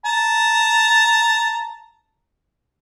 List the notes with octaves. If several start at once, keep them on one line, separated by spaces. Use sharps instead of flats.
A5 A#5